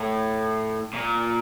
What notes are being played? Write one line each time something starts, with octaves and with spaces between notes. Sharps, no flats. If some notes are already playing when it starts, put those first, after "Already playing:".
Already playing: A2
A#2